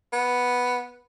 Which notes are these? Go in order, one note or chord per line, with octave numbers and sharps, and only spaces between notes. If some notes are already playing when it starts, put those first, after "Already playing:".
B3